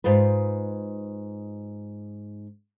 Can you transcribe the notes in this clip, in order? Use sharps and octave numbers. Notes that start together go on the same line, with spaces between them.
G#2 D#4 F4 B4